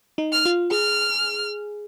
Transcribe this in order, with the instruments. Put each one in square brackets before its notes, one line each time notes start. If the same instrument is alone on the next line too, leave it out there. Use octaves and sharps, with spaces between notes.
[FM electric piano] D#4
[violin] F6
[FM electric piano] F4
[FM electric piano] G#4 [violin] F6